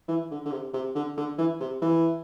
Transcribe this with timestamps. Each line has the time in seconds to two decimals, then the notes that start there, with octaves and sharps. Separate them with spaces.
0.08 E3
0.31 D3
0.45 D3
0.52 C3
0.74 C3
0.95 D3
1.17 D3
1.38 E3
1.60 C3
1.82 E3